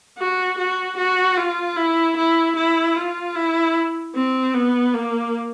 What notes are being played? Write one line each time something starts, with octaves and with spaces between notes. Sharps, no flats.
F#4
F#4
F#4
F4
E4
E4
E4
F4
E4
C4
B3
A#3